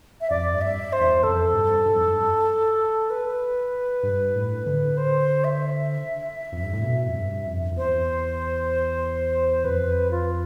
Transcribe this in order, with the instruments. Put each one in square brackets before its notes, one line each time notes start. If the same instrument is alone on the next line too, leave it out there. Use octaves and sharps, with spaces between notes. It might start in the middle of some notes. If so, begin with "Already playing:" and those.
[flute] E5
[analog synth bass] F2 [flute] D5
[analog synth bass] G2
[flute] E5
C5
[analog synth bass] E2
[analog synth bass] F2 [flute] A4
[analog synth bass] G2
G2
F2
G2
[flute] B4
[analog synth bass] G2
A2
D3
[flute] C5
E5
[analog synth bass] F2
G2
A2
B2
F2
G2
F2
F2
[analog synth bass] E2 [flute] C5
[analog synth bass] F2 [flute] B4
[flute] F4